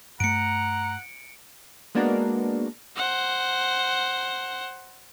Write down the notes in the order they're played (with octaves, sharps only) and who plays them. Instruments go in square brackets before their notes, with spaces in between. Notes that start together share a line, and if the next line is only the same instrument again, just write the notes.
[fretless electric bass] G2 A3 [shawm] F#5 [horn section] A#5 [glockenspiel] C#7 D7
[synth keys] G#3 A#3 B3 D4 F#4 A#4
[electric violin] C5 F#5